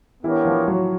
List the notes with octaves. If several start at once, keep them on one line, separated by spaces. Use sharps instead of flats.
E3 B3 D4 E4 G4 A#4 C#5
F3 F4
F#3 F#4